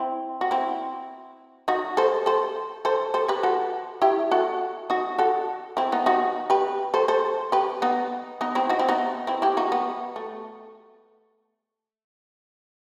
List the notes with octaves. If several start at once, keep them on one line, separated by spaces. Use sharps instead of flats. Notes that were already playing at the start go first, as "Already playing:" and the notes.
Already playing: C4 E4
F#4
C4 E4
D#4 F#4
A4 C5
A4 C5
A4 C5
A4 C5
G4 B4
F#4 A4
E4 G4
F#4 A4
D#4 F#4
F#4 A4
C4 E4
B3 D#4
D#4 F#4
G4 B4
A4 C5
A4 C5
G4 B4
B3 D#4
B3 D#4
C4 E4
D#4 F#4
C4 E4
B3 D#4
C4 E4
E4 G4
D#4 F#4
B3
A3